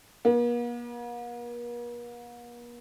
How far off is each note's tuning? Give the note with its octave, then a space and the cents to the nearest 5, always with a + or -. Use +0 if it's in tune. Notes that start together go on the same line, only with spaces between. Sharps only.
A#3 +45